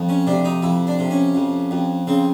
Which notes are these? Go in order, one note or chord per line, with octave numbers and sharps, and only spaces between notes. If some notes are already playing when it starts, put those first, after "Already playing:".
Already playing: F2
C#4
C3 D4
D#4
F2 E4
D4
C3
C#4
F2
F2
C#3 C4